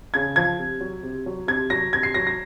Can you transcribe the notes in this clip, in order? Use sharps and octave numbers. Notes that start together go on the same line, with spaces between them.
C#3 G#6
F3 G#6
C3
F#3
C3
F#3
C3 G#6
F#3 A#6
C3 G#6
C7
F#3 A#6
A#6